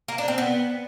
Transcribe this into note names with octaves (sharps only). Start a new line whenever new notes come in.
A#3
D4
C4
B3